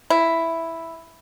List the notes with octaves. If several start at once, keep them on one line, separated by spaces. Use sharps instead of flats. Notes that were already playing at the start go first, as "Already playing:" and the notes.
E4